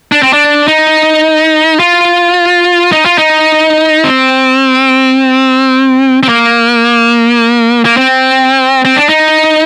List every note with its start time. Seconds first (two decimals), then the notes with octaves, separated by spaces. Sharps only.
0.12 D4
0.23 C4
0.33 D4
0.68 D#4
1.80 F4
2.92 D#4
3.05 F4
3.18 D#4
4.04 C4
6.23 C4
6.29 A#3
7.85 A#3
7.97 C4
8.85 C4
8.96 D4
9.09 D#4